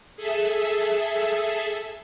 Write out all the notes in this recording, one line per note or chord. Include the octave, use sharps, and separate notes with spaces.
G#4 A4 E5